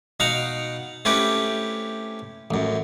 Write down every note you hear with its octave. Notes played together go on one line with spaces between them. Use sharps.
B2 D#4 F5 F#5 A#5
A3 C4 C#4 E4 G4 B4
A1 F#2